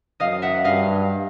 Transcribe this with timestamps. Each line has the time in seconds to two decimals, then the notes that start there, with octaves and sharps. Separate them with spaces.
0.20 F#2 D#5 F5
0.42 E5 F#5
0.64 G2 D#5 F5